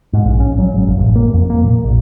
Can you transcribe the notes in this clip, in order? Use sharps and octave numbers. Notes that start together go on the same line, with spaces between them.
G#2
A#1
C#4
F#3
G#1
F#1
A1
A#3
F2
A#3
A#2
A#1